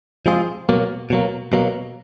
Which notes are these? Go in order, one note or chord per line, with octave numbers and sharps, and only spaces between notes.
F3 G#3 C4 F4 G#4
B2 F#3 A#3
B2 F#3 A#3
B2 F#3 A#3